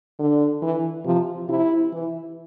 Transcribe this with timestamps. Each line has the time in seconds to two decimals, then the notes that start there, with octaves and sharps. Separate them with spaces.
0.19 D3
0.62 E3
1.05 C3 F3
1.49 C3 E4
1.92 E3